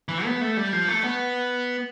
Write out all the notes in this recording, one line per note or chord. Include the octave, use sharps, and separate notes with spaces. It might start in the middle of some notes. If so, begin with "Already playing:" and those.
E3
B3
A3
G3
F3
A3
B3